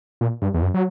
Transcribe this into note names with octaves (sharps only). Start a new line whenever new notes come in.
A#2
G2
E2
F#2
F#3